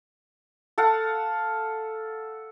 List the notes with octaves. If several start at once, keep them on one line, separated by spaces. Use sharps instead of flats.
A4 F5 F#5